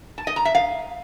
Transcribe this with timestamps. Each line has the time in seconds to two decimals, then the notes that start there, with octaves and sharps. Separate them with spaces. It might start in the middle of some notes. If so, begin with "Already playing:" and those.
0.18 A5
0.27 D#5
0.36 A#5
0.45 E5
0.55 F5